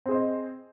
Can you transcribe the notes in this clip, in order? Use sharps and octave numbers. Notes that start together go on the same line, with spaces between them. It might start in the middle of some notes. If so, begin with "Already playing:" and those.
C4 G#4 C5 D#5